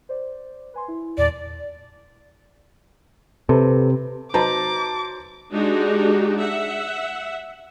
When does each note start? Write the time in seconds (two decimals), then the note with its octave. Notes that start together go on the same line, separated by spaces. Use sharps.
0.09 C5 D5
0.74 B4 G#5 C6
0.88 E4
1.18 E2 A#2 D5 A5
3.49 C3 A4 B4 C5
4.34 F#3 D#4 B4 C5 A5 A#5 D6
5.52 G#3 D4 D#4 F#4 G4
6.39 E5 F#5